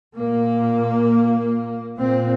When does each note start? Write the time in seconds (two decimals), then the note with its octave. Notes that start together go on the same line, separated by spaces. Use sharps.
0.15 A#2 A#3
1.99 A#2 C4